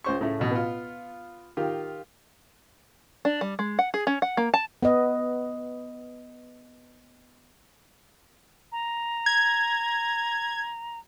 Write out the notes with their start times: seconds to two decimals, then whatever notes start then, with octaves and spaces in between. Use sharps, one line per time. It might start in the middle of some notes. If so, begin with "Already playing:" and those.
0.04 C#2 C5 C#6
0.21 A2 C#3 A3
0.39 A1 B2
0.51 B3 F4
1.57 D#3 F4 G4
3.25 D4
3.41 G3
3.59 G#3
3.79 F#5
3.94 G#4
4.07 C#4
4.22 F#5
4.37 A#3
4.54 A5
4.83 B3 B4 D#5
8.72 A#5
9.26 G#6